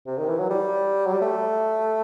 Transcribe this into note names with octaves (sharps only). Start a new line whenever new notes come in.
C3
D#3
E3
F#3
G3
F#3
G3
A3